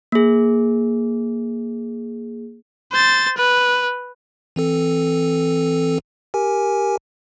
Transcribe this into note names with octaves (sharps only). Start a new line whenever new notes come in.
A#3 G#4
C5 A6
B4
E3 C4 A4
G4 A#4 G#5